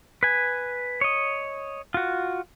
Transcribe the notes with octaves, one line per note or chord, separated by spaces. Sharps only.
B4 G#5
C#5 D#5
F4 F#4